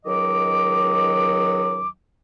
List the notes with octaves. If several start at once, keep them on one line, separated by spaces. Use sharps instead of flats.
C#2 D#3 F#3 D#5 D6